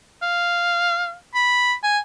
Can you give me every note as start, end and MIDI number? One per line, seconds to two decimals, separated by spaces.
0.22 1.15 77
1.35 1.74 83
1.83 1.99 80